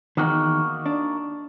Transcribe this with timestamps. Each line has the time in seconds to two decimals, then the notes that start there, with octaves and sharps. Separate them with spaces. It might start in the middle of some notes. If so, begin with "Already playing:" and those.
0.17 E2 D#3 A#3 D#4 F#4
0.86 D4